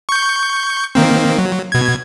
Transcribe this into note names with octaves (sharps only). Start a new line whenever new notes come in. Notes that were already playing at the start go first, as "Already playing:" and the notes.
C#6 G6
D#3 A#3 C4
F#3
B2 G#6